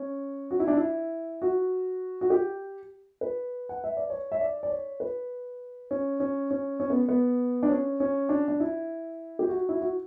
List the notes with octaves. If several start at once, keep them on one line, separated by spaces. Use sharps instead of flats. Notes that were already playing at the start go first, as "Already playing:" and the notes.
Already playing: C#4
F#4
E4
D4
E4
F#4
F#4
G4
B4
F#5
E5
D5
C#5
E5
D5
D5
C#5
B4
C#4
C#4
C#4
C#4
B3
B3
D4
C#4
C#4
D4
D4
E4
G4
F#4
E4
F#4